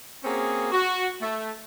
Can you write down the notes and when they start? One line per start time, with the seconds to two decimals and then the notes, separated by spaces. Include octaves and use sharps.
0.24 A#3 C4 C#4 F#4 G#4
0.72 F#4
1.21 A3